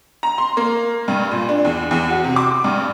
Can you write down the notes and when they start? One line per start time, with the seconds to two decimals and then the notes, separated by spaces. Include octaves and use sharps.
0.23 A#5
0.38 C6
0.57 A#3
1.08 G2
1.31 A#2
1.49 D4
1.65 E2
1.91 E2
2.10 F#4
2.24 C3
2.36 D6
2.64 G2